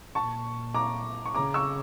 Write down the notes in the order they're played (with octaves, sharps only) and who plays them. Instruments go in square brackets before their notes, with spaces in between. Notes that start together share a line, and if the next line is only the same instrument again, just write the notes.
[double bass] A#2 [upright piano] A5 C#6
[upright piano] A#5 D6
C#6
[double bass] C#3 [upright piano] A#5 D6
[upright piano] C#6 E6